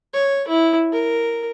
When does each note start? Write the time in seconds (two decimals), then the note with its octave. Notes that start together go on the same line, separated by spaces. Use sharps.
0.14 C#5
0.48 E4
0.93 A#4